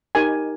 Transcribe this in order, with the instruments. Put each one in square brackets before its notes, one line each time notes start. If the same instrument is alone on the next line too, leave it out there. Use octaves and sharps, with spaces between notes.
[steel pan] D#4 G4 A#4 G#5